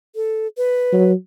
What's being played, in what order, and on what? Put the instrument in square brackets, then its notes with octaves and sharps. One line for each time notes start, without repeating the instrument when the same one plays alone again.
[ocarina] A4
B4
[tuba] F#3